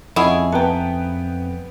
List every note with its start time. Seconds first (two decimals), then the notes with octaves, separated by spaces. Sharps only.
0.16 F2 C#4 E4 G#4 D#5 F#5 B5
0.52 B3 B4 G5 A5 A#5